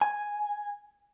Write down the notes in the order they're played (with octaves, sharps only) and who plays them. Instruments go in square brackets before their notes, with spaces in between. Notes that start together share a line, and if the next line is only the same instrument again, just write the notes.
[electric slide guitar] G#5